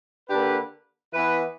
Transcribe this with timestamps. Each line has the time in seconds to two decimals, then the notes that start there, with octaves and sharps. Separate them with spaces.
0.29 D3 A#3 D4 G4 B4
1.12 E3 B3 E4 B4